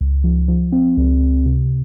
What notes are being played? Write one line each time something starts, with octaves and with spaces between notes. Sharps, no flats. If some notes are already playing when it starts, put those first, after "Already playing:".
C#2
F3
F3
C4
C#2
C#2
C3